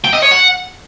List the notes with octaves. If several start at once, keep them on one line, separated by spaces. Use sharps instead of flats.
G5
D#5
C#5
F#5